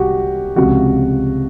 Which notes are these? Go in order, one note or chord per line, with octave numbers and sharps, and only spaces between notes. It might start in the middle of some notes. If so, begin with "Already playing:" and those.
Already playing: C2 F#4 G4
C#2 C3 F3 F#4